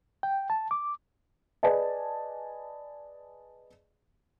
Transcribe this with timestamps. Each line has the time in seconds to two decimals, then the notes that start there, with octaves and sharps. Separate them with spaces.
0.23 G5
0.50 A5
0.71 D6
1.63 G#4 B4 D5 D#5 G#5 A5